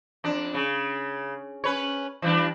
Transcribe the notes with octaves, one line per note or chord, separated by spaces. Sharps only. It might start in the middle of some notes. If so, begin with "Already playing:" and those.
F2 D4
C#3
C#4 B4 C#5
E3 G3 D4